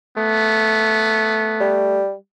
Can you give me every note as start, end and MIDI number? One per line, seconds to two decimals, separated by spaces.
0.18 2.00 57
0.18 1.78 59
1.61 2.14 55